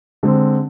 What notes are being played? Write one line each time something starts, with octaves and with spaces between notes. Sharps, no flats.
D3 G#3 C4